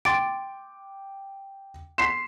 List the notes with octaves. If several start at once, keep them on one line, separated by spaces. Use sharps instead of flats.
G5 C6 D6 A6 D7
C6 B6 C7 E7